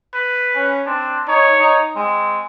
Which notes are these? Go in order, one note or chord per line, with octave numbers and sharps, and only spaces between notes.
B4
C#4
C4 D4
D#4 C#5
D#4
G#3 C4